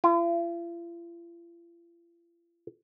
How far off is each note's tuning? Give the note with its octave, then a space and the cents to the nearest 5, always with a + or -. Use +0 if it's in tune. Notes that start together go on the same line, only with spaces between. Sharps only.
F4 -45